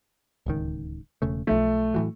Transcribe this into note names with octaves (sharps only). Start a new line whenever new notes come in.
D1 C#2 D#3
E1 C#3 A3
B1 F3 A3
A2 E3 F#3